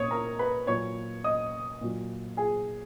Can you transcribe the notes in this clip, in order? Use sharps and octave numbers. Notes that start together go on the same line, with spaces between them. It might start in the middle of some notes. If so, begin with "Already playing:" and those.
Already playing: A#2 C#5 C#6 D#6
A#4 A#5
B4 B5
A#2 F#3 C#5 C#6
D#5 D#6
A#2 F#3
G#4 G#5